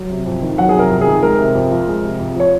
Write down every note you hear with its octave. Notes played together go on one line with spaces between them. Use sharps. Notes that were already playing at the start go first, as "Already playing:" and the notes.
Already playing: F#3
C3
F2
D#3
F#3 F#5
G#4
C3
A#4
F2
G#4
D#3
G#3 A#4
C3
F2
F3
G#3
C3
F2
F3 C#5